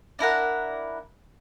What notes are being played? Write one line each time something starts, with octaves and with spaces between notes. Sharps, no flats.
D4 E4 A#4 F#5